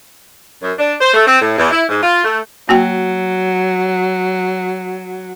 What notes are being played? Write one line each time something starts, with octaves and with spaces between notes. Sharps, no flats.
F#2
D4
C5
A3
C4
A2
E2
E4
G#2
F4
A3
F#3 A#3 F#4 G5